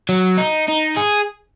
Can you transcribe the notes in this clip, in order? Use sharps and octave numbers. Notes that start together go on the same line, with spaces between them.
F#3
D#4
D#4
G#4